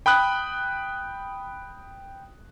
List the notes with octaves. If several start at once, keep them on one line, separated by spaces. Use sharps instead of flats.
G5 B5 D#6 F#6